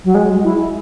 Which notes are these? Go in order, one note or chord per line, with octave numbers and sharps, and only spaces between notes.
F#3
G#3
E4